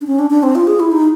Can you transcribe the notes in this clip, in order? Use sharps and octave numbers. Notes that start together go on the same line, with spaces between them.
D4
C#4
D4
D4
C4
F4
G#4
E4
D#4